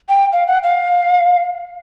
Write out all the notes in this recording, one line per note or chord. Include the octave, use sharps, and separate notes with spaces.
G5
F5
F#5
F5